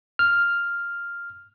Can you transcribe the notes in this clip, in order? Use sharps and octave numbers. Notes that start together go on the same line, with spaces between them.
F6